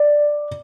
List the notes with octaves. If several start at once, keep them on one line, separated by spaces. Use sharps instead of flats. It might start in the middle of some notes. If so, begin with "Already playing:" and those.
Already playing: D5